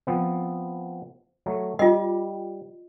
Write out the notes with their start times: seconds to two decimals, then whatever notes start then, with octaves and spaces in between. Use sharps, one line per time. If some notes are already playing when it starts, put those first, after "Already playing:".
0.07 F3 B3 C4
1.46 F#3 A3
1.79 G3 F4 D#5